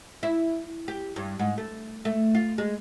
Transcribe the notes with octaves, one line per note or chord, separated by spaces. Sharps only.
E4
G4
G2
G#2
A3
A3
F4
G#3